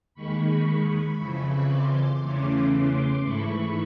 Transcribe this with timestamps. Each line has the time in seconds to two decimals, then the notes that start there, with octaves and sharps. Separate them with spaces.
0.14 D#2 D#3 G#3 B5 C#6
1.18 F2 C#3 E3
1.69 C6 D6
2.21 E2 C#3 E3 A3 C#4 C6 D6
2.72 C6 D6
3.23 G#2 E3 A3 B5 C#6